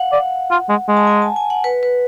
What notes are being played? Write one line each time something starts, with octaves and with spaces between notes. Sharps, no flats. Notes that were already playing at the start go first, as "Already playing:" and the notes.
Already playing: F5 F#5
D5
F4
G#3
G#3
A5
G#5
A5
G#5
F#5
B4
B4